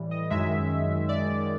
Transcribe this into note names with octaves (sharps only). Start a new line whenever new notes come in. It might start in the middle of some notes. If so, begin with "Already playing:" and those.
Already playing: A2 E3 G3
D#5
F#2 D#3 G#3 E5
D5